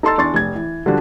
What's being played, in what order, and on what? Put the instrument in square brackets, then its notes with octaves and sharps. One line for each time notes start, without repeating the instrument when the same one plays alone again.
[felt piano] D#4 A4 A5 C6 E6 A6
E2 D4 D5 C6 C#6 A6
F1 G#6
E3
D3 F3 G3 D4 F#4